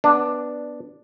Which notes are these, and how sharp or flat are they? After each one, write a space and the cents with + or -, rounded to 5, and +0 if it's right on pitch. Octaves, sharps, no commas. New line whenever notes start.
B3 +0 D4 +0